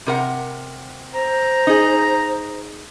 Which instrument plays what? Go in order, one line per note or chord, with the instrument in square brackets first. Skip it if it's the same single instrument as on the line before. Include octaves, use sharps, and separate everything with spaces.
[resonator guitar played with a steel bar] C3 A#4 F#5
[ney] C5 [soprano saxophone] A#5
[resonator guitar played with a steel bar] D#4 G#4